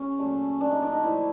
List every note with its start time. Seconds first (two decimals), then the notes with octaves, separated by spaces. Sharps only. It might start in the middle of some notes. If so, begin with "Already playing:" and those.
Already playing: C#3 C#4
0.19 A#2 F#3 A3
0.61 D4
0.71 D#4
0.82 D4
0.93 D#4
1.03 D3 F3 A3 E4